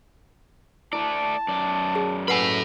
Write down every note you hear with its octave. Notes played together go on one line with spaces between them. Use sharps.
A3 E4 D5 A5
F#2 D5
G#4
A4 B4 F#5 G#5 B5